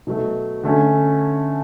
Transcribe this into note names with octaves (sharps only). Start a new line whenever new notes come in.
B2 F#3 A3
D3 A3 C#4